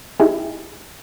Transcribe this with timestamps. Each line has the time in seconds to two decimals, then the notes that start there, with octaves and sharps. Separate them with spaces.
0.20 D#4 E4 G4 G#4